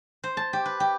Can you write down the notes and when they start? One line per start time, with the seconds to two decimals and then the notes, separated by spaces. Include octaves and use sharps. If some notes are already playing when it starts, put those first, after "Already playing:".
0.24 C5
0.37 A5
0.53 G4
0.66 B4
0.80 G4